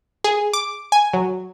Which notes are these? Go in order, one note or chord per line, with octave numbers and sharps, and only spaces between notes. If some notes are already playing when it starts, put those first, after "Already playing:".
G#4
D6
G#5
F#3